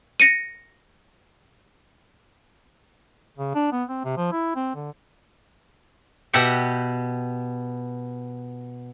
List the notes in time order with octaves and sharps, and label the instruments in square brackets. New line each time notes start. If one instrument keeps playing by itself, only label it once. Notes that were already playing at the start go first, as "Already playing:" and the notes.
[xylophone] A#6 C#7 D#7
[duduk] C#3
D4
B3
C4
C3
F3
E4
C4
D3
[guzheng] B2 G4 E5 F#5 G5